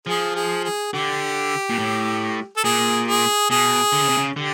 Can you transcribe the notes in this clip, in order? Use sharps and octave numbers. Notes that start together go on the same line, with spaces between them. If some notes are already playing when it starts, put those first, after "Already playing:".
F3 G#4
G#4
G#4
D3 G4
A#2
A2
A4
A#2 G#4
G#4
B2 G#4
D3
C#3
C3
C#3
D3 G4